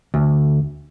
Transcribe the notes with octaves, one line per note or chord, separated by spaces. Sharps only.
D2